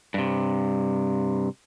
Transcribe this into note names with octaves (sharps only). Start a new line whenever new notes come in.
G2 C3